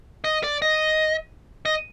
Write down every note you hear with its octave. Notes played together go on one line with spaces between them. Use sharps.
D#5
D5
D#5
D#5